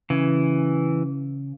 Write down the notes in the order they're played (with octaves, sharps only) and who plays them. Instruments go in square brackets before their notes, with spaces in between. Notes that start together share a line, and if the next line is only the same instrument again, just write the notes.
[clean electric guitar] C#3 [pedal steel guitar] E3